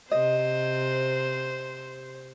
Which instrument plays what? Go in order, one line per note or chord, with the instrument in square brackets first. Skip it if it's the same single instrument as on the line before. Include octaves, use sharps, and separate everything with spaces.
[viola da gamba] C3 [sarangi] C5 [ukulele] D#5